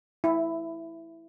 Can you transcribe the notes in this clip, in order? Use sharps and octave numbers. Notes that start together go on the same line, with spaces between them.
E4